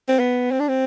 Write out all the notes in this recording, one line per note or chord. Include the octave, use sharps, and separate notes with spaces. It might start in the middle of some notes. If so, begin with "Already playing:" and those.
C4
B3
C4
D4
C4